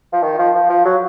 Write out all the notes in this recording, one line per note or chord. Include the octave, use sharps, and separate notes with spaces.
F3
D#3
F3
F3
F3
F#3